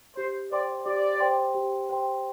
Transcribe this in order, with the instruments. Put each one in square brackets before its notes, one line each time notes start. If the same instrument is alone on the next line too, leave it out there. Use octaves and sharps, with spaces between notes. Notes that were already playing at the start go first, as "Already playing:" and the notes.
[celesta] G4 [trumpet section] C5
[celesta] C5 G5 C6 [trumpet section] D5
[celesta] G4 [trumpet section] D5
[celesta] C5 G5 C6
G4
C5 G5 C6